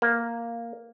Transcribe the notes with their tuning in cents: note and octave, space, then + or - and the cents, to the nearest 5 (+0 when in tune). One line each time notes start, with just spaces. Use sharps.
A#3 +0